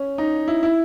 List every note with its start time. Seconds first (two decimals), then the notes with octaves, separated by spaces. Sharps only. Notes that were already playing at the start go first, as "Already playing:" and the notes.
Already playing: C#4
0.18 D#4
0.48 E4
0.63 E4